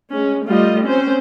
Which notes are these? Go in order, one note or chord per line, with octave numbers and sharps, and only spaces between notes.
G#3 C#4
G3 A3 F4 D#5
C4 C#4 C5